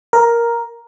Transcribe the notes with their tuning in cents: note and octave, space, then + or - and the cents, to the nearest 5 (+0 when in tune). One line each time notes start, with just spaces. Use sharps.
A#4 +5